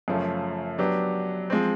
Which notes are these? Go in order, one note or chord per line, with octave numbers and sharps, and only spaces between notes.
F#2 C#3 F3 A3 C#4
F#3 B3 D4 G4
F3 G#3 C4